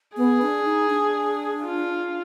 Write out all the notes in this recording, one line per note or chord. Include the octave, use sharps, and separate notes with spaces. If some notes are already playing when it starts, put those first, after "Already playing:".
B3 G#4
D4
D#4
D4
F4